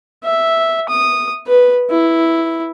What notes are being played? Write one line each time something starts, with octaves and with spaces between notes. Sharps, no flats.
E5
D#6
B4
E4